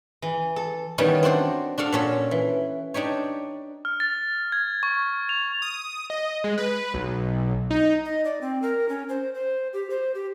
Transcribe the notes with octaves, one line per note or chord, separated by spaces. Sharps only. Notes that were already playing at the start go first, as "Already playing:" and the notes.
E3
A4
D#3 E3 G3 B3 C#4 D#4
C4 D4 F#4 C5
D4 F#4 A4 F5
A#2 C#4 A4
E3
D4 D#4 G4 C#5
F6
A6
G#6
C#6
F7
D#6
D#5
G#3
B4
B1
D#4
D#5
D5
C4
A#4
C#4
C5
C5
G4
C5
G4